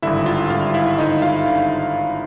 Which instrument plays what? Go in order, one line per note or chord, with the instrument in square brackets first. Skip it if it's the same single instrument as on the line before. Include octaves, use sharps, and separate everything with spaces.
[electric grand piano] G#1 G2 D3 E4 E5
F4 F5
G#1 G2 D3 F4 F5
E4 E5
G#1 G2 D3 D#4 D#5
F4 F5
D3